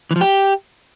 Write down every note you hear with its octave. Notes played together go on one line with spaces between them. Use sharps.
E3
F3
G4